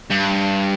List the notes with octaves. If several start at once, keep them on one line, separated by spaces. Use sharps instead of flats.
G2